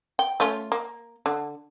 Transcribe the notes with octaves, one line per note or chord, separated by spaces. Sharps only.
G5
A3 C#4 F4
A#3
D3